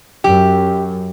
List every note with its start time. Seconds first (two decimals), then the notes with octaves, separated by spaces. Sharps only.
0.24 F#2 G4